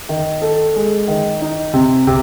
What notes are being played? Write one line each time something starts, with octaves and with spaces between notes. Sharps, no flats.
D#3
A4
G#3
D#3
D#4
C3
C3